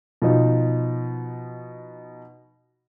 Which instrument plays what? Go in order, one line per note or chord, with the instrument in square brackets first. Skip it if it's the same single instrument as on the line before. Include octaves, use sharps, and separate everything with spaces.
[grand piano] B2 F3 D#4